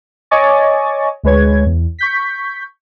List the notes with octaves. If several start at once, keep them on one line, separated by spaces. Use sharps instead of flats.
C#5 D#5 G#5 C#6 D6 A6
D2 G#3 B4 C#5 G#6
E2
C#6 G6 B6